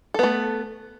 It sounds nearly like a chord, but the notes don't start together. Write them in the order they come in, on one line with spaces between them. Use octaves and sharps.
A4 B3 A3